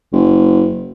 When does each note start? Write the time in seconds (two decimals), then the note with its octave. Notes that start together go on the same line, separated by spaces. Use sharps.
0.13 F#1